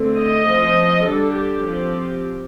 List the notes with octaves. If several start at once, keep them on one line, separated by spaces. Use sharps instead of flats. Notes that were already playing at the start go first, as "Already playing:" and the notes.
Already playing: D3 A3 C4
D#5
F3 C4
D3 G3 D4 A4
G4
F3 C4